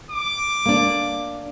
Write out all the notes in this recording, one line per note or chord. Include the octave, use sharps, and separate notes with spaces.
D6
A#3 D4